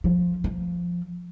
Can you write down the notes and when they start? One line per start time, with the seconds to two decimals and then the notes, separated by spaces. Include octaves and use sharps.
0.04 F3
0.44 F3